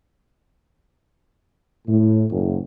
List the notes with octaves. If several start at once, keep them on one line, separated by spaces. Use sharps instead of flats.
A2
F#1